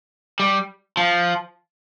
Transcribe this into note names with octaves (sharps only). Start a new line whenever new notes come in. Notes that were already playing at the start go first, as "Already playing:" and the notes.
G3
F3